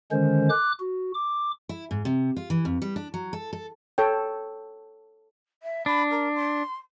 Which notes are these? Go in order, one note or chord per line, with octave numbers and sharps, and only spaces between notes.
D3 D#3 G#3 C#4 C5
D6 F#6
F#4
D6
E4
G#2
C3
F4
E3
F2
G3
D4
F#3
A4
A4
A4 C#5 G5
E5
D4 B5
A#4
C6